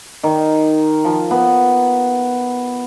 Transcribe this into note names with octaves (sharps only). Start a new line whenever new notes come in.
D#3
F3
B3